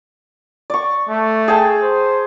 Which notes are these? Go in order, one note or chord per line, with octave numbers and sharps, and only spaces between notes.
D5 C#6
A3
G#4 G5 A5
C5